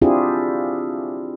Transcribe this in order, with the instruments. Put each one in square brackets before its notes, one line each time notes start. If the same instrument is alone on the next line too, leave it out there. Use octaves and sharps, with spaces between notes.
[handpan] C4 D4 E4 F4 G4 G#4